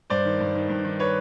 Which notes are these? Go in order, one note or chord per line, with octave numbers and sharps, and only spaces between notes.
G2 C5 D5
D#3
G2
D#3
G2
D#3
B4 C#5